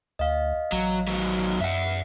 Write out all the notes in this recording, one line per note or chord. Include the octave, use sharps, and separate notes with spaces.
D2 D#5 F5
A1 F#3
D#3 F#3
F#2 E5 F#5